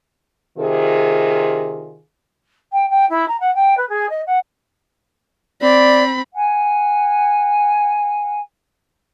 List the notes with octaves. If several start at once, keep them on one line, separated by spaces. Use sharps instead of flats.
C3 D#3 F4 G#4
G5
G5
E4
A#5
F#5
G5
B4
G#4
D#5
F#5
C4 D5 B5
F#5 G#5